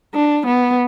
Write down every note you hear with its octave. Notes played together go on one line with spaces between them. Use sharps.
D4
B3